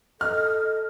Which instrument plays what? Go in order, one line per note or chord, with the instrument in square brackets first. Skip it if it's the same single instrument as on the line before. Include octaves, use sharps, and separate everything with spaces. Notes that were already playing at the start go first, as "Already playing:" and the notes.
[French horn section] A4 [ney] D#5 [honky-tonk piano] F6